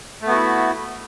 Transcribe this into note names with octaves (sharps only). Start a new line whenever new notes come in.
A3 B3 E4 F#4